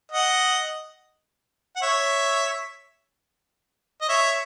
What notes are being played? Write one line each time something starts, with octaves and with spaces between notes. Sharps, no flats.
D#5 F#5
F#5
C#5 E5
D#5
C#5 E5